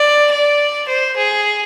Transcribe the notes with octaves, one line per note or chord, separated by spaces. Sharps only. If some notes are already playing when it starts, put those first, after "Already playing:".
Already playing: D5
D5
C5
G#4